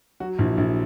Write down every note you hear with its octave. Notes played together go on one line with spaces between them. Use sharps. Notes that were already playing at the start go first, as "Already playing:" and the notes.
F#3 F#4
A#1 E4
A#1 E4